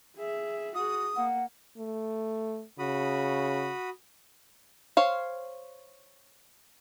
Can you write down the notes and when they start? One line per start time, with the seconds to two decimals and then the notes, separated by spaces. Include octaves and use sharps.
0.17 G#4 E5
0.75 F#4 G#4 D#6
1.16 A#3 F#5
1.77 A3
2.79 C#3 F#4 B5 D#6
4.97 C5 C#5 F5